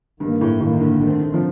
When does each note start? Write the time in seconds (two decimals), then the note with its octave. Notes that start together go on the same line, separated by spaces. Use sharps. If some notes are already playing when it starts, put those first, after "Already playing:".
0.20 G2 D#3 A#3
0.41 A2
0.60 A2 D#3 A#3
0.80 D3
1.00 D3 D#3 A3 C4
1.21 D3
1.34 F3